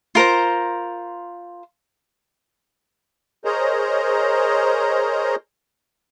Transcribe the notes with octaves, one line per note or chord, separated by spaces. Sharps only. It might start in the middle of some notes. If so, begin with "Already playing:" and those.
F4 A#4 C5 A#5
G#4 A#4 C5 C#5 D#5 A#5